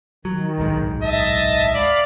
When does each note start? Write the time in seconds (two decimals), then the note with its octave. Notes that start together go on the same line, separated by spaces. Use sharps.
0.25 D#3 F#3
0.58 D1 B1 G#2
1.02 D#5 E5 A5 D#6
1.74 D5 F5 B5